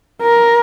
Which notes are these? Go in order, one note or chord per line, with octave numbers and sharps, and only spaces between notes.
A#4